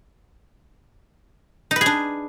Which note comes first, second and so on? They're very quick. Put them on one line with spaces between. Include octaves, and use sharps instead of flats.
D#4 B4 G#4 D4